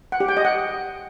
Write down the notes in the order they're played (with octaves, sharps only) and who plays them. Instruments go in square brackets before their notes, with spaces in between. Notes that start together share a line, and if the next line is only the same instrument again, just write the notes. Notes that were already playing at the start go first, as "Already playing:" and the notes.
[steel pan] F#5
G4
G5
D#5
F#5